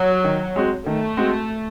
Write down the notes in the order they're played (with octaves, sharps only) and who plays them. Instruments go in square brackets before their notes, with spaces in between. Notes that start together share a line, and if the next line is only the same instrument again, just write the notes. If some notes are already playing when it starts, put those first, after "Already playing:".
Already playing: [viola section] F#3
[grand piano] D#3
G#3 C4 F#4
[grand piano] D#3 [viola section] A3
[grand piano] G#3 C4 F#4